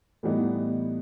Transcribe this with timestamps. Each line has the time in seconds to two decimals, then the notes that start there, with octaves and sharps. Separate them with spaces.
0.23 A2 E3 G3 B3 D#4